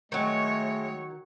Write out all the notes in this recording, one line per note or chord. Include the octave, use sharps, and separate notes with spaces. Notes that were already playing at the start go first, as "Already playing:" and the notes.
D#3 F#3 G#3 A3 C#5